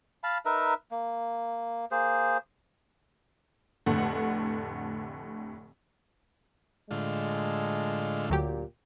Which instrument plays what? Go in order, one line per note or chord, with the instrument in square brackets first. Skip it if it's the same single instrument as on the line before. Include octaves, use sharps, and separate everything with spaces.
[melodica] F5 A5 B5
D#4 A#4 B4 E5
A#3
A#3 G#4 C5
[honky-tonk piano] F1 A2 D3 A3 F#5
[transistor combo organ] A2 D3 F4 [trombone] G#3
[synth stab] D2 F#3 G4 [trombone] A#2